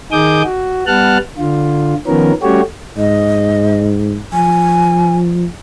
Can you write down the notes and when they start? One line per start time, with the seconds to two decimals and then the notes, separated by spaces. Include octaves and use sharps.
0.12 D#3 D#4 G#4 D6 D#6 G6
0.45 F#4
0.87 G3 B3 F#5 A5 F6 F#6
1.38 D3 F4
2.07 D#3 F3 B3 C#4 A#4
2.43 G3 A3 C#4 F#4 G4 C#5
2.97 G#2 D#5
4.33 F3 G#5